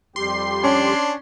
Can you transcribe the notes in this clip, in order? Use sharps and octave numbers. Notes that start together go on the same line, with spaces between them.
F2 G3 G4 C6
C#4 D4